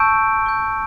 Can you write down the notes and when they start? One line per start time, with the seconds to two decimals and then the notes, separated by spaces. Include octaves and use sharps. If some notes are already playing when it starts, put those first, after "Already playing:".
Already playing: A5 C#6 E6 G6 D7
0.46 C#6 G6